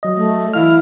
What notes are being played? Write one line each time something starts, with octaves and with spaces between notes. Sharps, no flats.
F#3 D#5
A3
E3 E4 F5 F6